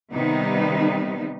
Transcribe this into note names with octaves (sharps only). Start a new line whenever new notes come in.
C3 D#3 G3 B3 D#4